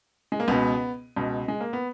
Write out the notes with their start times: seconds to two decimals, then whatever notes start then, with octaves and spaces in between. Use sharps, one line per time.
0.32 G#3
0.40 A#3
0.48 C#2 B2 B3
1.16 C#2 B2
1.48 G#3
1.61 A#3
1.73 B3